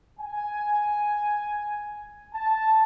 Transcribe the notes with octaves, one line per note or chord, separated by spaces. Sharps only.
G#5
A5